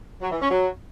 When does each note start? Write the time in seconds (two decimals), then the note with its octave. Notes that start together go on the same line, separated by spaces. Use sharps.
0.22 F#3
0.31 E3
0.41 C#4
0.51 F#3